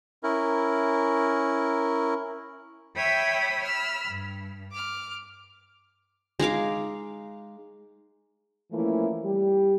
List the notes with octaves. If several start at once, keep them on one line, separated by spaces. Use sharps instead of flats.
C#4 E4 A#4
C#5 E5 G5 B5 D#6 E6
B5 E6 F6
G2
D6 F6
G#3 D#4 F5 D6
E3 F3 A3 A#3 C#4 E4
G3 G4